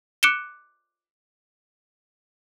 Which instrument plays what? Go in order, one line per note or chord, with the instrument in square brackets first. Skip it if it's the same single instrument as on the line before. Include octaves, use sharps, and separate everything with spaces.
[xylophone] D6 F#6 C#7 D7 E7 G7